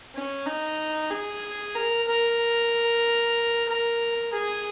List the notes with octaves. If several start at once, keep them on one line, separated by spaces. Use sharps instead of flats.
C#4
D#4
G#4
A#4
A#4
A#4
G#4